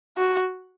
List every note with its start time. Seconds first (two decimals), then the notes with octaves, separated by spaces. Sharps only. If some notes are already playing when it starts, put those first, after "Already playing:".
0.17 F#4